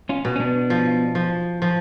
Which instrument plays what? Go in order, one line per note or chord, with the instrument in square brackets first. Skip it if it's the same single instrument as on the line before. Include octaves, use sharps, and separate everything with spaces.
[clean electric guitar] C#4 F4
[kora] B2
[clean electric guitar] C#4
B3 D4
[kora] F3
F3
F3